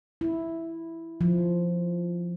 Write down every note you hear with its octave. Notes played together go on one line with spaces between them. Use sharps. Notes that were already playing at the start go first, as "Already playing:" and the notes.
E4
F3